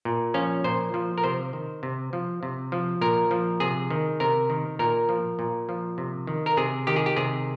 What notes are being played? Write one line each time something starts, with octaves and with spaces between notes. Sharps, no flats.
A#2
F3 C#4
A#2 C5
F3
A#4
C3 C5
D#3
C3
F3
C3
F3
A#2 A#4
F3
C3 G#4
D#3
C3 A#4
D#3
A#2 A#4
F3
A#2
F3
C3
D#3
A#4
C3 G#4
D#3 G4
G#4
G4
C3 G#4